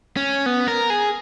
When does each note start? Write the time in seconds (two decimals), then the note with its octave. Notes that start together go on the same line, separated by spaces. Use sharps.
0.16 C#4
0.46 B3
0.68 A#4
0.90 G#4